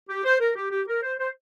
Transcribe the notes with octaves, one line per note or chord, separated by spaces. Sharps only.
G4
C5
A#4
G4
G4
A#4
C5
C5